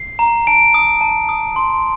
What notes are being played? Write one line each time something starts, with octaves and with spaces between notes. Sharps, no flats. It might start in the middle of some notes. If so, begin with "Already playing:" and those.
Already playing: C7
A#5
A5 D7
D#6
A5
D#6
C6